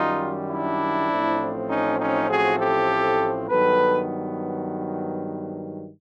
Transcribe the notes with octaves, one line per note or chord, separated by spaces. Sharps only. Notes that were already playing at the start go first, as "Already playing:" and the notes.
Already playing: F#2 D#3 G3 D#4 F4
D4 E4
A1 A2 F3 A3 C4
C#4 D#4
C#4 D#4
F#4 G#4
G4 A4
G2 D#3 F#3 B3 A4 B4